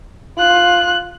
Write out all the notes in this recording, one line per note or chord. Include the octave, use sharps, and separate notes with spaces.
F4 F#6